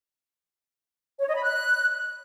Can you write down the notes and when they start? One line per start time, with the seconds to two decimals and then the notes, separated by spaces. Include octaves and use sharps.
1.20 C#5
1.28 D#5
1.35 B5
1.43 F#6